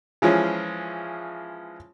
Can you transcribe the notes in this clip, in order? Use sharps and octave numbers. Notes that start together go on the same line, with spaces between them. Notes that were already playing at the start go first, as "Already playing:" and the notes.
E3 F3 G#3 C#4